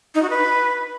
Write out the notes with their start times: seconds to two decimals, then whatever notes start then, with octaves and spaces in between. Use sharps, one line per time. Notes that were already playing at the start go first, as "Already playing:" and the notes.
0.15 D#4
0.22 F#4
0.30 B4